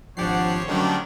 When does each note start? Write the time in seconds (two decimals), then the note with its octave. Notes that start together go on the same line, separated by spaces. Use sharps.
0.17 G#1 F3 D4 G4 C5 C#5 F#5 C7
0.68 F#2 D3 D#3 G3 A3 D4